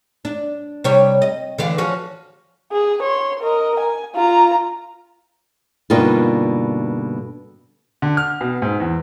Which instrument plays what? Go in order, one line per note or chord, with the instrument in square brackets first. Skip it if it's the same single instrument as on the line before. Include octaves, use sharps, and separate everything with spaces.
[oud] D4
C3 G3 C#5
D#5
D3 E3 F5
F3 C#4 F#4
[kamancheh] G#4
C#5 C6
A#4 D#5
G#5
F4 A#5
[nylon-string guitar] G2 B2 D3 A#3 D#4 F4
[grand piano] D3
F6
B2
G#2
E2